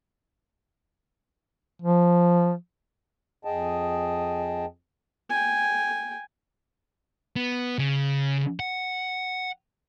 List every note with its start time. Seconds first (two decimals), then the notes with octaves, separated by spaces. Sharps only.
1.82 F3
3.45 F2 G#4 D#5 G5 A5
5.30 G5 G#5
7.36 B3
7.78 C#3
8.60 F#5